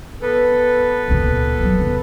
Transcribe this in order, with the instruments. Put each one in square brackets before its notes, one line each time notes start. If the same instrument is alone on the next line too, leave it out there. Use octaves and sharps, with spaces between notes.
[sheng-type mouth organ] B3 A4 B4
[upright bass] C#2 A#2
G1 F#3
E2 C#3